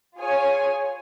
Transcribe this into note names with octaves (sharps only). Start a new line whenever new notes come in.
F4 G#4 C#5 G#5